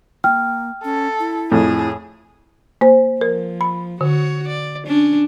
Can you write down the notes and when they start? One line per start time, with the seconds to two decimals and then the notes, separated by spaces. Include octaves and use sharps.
0.24 A#3 G5 F6
0.84 C#4 A4
1.19 E4
1.52 F2 A2 G#4
2.81 A#3 C5
3.21 F3 A#4
3.61 B5
4.01 D3 F#4 C#5
4.48 D5
4.87 C#4 D4